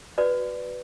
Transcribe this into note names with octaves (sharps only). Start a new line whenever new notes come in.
F#4 B4 D5